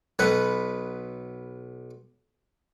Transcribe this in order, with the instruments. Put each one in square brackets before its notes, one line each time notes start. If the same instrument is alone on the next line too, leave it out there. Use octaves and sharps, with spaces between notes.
[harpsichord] B1 B4 F#5